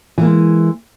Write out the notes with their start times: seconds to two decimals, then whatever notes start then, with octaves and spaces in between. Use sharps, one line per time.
0.18 E3
0.21 A#3
0.25 G#3